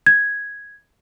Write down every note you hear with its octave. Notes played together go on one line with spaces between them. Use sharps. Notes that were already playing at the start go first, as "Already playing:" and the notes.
G#6